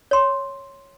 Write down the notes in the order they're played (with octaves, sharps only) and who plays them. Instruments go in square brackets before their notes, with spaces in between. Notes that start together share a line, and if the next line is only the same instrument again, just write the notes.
[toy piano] C#5 C6